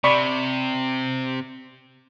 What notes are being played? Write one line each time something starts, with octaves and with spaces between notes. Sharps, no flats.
C3 D5 B5 C#6